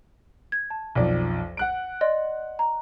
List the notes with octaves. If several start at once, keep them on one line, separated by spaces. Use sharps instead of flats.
G#6
A5
B1 F2 D5
F#5 F#6 D7
D5 D#5 C6
A#5